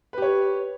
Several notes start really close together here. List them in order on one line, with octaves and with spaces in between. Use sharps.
B4 G4 C#5